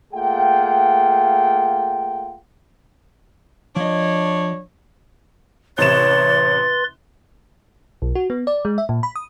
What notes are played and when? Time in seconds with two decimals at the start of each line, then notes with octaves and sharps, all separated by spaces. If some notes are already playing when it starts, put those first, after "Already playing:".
0.14 A3 A#3 F4 G#4 F#5 G5
3.76 F3 D4 C#5 D#5
5.78 A1 C3 B4 C#5 C6 A6 E7
8.02 B1
8.15 F#4
8.30 B3
8.47 D5
8.65 G#3
8.78 E5
8.89 A#2
9.03 B5
9.16 D#6